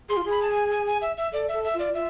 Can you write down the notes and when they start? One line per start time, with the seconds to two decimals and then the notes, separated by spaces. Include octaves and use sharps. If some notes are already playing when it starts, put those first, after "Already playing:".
0.09 G#4 C6
0.17 F4
0.25 G#4
0.30 B5
0.42 A5
0.50 G#5
0.71 G#5
0.87 G#5
1.02 E5
1.17 E5
1.33 A4 D5
1.48 A4 E5
1.64 E5
1.74 F4
1.79 D5
1.94 F4 E5